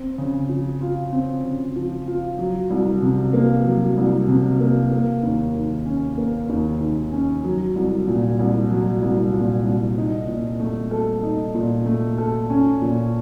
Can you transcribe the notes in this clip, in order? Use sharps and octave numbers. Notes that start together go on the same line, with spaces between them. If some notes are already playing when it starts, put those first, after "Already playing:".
Already playing: C4
C#3
F3
F4
C4
C#3
F3
F4
F#3
C2
C3
A#3
F#3
C2
C3
A#3
A#3
D#2
D#3
C#4
A#3
D#2
D#3
C#4
F#3
C2
A#2
C2
F#3
C2
A#2
C2
D#4
A#2
A3
A4
D#4
A#2
A3
A4
C#4
A#2